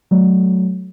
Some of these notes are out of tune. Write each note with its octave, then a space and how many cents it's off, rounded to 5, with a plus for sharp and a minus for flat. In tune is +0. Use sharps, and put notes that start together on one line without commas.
F#3 +0 A3 -25